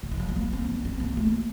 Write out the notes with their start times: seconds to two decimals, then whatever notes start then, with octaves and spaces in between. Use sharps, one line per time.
0.03 D3
0.11 D#3
0.20 F3
0.28 G3
0.36 A#3
0.53 C4
0.68 D4
0.85 C4
1.00 A#3
1.17 A3